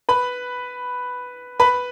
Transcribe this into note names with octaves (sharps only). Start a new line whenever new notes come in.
B4 B5
B4 B5